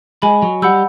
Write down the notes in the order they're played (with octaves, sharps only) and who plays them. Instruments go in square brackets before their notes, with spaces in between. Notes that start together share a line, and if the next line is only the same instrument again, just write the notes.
[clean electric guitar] G#3 [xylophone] D#5 G#5 B5
[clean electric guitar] F#3
[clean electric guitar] G3 [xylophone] F#5 B5 E6 G6